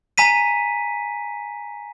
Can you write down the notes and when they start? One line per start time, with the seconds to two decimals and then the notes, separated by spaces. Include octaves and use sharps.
0.18 G#5 A#5 B6 D#7